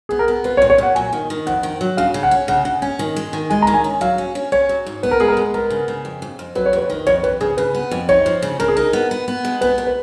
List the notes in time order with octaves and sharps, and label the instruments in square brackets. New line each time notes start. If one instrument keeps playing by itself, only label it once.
[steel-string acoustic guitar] B3 [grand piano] G#4
[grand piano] A#4
[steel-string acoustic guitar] B3
[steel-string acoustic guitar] F4 [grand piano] B4
[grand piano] C#5
[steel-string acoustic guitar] A#2
[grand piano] C#5
[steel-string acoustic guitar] A#2 [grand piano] F#5
[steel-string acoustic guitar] F#3 [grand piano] G#5
[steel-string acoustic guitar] D#3
D#3
[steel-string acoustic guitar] F2 [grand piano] F#5
[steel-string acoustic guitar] D#3
F#3
[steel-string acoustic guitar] C#3 [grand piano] F5
[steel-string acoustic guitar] C#3
[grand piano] F#5
[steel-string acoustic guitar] C#4
[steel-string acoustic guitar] C#3 [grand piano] F#5
[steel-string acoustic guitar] C#3 [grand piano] F#5
[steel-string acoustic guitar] C#4 [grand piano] G#5
[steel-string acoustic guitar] D#3
G#3
D#3
[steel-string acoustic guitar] G#3 [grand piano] G#5
[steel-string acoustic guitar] D#3 [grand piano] A#5
[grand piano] G#5
[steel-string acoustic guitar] C#4
[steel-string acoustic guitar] F#3 [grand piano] F5
[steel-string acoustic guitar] C#4
C#4
[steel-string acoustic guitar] C#4 [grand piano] C#5
[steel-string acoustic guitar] F#3
G#2
[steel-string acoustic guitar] B3 [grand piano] B4
[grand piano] A#4
[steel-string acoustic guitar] G#3 [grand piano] G#4
[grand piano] A#4
[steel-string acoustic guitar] G#3
[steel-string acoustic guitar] B3 [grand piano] A#4
[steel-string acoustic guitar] C#3
C#3
F2
F2
F2
[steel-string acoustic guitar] F#3 [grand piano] B4
[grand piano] C#5
[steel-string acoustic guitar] F2 [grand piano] B4
[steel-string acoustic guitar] D#3
[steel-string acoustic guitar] F2 [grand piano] C#5
[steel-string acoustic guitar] F2 [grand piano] B4
[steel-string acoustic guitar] C#3 [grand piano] G#4
[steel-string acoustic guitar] C#3 [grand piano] B4
[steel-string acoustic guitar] B3
F2
[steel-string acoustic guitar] D#4 [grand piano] C#5
[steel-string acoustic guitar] F3
C#3
[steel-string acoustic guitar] C#3 [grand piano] A#4
[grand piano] G#4
[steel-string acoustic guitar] D#4 [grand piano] A#4
[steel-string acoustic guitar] B3
B3
B3
G#3
[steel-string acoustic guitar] B3 [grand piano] B4
[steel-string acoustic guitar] A#2
[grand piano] B4